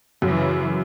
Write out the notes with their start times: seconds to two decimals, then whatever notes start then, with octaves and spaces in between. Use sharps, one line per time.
0.22 F#2 C#3 E3